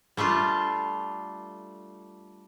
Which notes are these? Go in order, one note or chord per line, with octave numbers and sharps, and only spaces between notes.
G3 A3 D4 F4